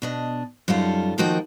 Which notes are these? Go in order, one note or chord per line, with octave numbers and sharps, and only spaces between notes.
B2 D4 D#5
F#2 G3 D#4 F4 A4
D#3 F3 A#3 F#4 D#5 G5